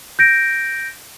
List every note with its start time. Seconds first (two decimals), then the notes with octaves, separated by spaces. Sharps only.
0.19 G6 A#6 D7